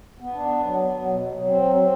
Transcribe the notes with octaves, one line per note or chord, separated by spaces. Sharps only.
B3
D4
B3
F#3
B3
F#3
B2
F#3
F#3
C4
F#3
C4